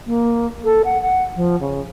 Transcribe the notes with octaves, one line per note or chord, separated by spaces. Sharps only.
A#3
A4
F#5
F#5
F3
C#3